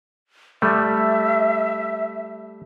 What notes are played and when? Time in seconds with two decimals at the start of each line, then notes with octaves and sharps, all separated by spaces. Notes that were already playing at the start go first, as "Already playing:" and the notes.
0.62 G3 A3 E5